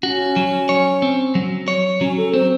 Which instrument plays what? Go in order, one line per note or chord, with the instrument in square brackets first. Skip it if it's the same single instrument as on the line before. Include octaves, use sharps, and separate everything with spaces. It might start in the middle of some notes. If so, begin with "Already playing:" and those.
[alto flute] C#4 [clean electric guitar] F#4
[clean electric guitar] F#3
C#5
C4
F#3
C#5
[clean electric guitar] F#3 [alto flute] C#4
[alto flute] A4
[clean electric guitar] C4 [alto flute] C5